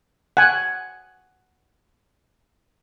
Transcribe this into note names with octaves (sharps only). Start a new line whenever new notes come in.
F#5 G#5